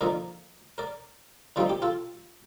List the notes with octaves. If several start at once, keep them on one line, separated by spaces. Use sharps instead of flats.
D3 F3 A#3 D#4 A#4 D5
A#4 D5
D3 G3 C4 D#4 F4
G4
F4 A4